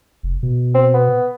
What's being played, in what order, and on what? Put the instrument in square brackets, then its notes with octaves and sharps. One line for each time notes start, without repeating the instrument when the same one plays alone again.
[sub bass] F1
B2
[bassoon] C4
B3